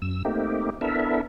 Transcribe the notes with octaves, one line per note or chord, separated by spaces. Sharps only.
F#2 E6
A3 A#3 C4 D#4 G4
B3 D4 E4 A4 A#4 E5